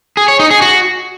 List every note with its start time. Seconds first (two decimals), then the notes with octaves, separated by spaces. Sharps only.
0.17 G#4
0.28 C#5
0.39 D#4
0.51 G#4
0.62 F#4